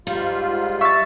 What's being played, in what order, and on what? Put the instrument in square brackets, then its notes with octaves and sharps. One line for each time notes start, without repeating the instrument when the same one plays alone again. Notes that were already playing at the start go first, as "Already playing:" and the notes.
[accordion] G#2 F4 [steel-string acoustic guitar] G3
[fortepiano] E5 E6 [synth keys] C#6 A6